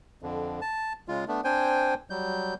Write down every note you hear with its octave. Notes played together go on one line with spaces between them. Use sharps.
F2 D3
A5
C#3 G#3 F4
A3 B3 D4
C4 D4 C5 G5 G#5
F#3 G3 G6